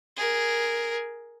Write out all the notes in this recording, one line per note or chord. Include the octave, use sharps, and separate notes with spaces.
G#4 A#4